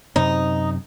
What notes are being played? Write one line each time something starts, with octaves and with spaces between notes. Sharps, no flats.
F#2 C3 C4 D#4